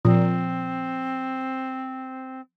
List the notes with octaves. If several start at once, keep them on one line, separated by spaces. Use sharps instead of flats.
A#2 F3 C4